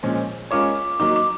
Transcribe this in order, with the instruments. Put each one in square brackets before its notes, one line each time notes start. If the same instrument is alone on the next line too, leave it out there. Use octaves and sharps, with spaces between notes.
[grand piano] A#2 F3 G#3 C#4
[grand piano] G#3 C#4 F4 A#4 C#5 [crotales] D6
[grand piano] F#3 A#3 D#4 [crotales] D6
[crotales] D6